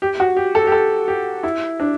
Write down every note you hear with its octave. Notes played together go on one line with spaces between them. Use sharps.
G4
F#4
G4
A4
G4
A4
G4
E4
D4